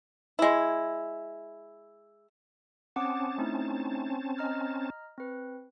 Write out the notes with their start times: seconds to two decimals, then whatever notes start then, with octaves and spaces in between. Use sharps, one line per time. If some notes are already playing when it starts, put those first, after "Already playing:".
0.39 G#3 E4
2.96 C4 C#4 F#5 A5 D6 D#6
3.38 A3 D#4 E4
4.38 D#5 A#5 F6
5.18 C4 B4